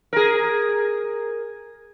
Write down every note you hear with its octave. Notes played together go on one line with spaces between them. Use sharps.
G#4 A#4